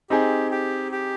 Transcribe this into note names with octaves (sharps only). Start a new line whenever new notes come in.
C4 D#4 G4 G#4
G4
G4